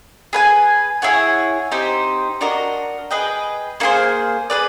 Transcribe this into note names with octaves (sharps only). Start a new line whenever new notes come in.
G#4 B4 E5 G#5
E4 G#4 C#5 F#5
C4 D#4 G4 C5
D4 F#4 A#4 D#5
G#4 B4 D#5 G5
A#3 D#4 G#4 C5
G#4 B4 D5